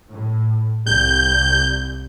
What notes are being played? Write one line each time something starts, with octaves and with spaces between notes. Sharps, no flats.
A2
C2 G6